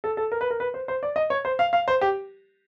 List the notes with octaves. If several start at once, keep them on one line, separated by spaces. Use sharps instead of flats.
A4
A4
A#4
B4
A#4
B4
C5
C5
D5
D#5
C#5
C5
F5
F5
C5
G4